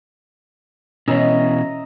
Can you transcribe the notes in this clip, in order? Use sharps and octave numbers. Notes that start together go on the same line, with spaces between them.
B2 E3 C#4 D#5 E5 A#5